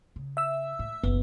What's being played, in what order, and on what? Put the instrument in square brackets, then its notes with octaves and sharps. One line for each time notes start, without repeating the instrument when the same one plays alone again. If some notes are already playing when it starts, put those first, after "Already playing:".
[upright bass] C#3
[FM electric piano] E5 E6
[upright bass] A2
[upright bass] F#1 B1 [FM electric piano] B3